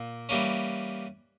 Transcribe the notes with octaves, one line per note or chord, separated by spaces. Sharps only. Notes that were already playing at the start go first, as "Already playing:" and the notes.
Already playing: A#2 A#3
E3 G3 A#3 C#4